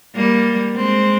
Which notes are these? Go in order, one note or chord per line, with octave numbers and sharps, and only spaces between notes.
G3 A#3
G#3 C4